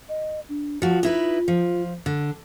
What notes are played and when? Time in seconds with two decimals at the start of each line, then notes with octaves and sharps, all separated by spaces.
0.09 D#5
0.49 D4
0.82 F3 F4 F#4
1.03 D#4 E4 B4
1.48 F3
2.06 D3